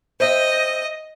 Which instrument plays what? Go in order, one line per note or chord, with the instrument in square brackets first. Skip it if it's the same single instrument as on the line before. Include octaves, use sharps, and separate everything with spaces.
[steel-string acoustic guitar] C5 E5 G5 [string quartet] D#5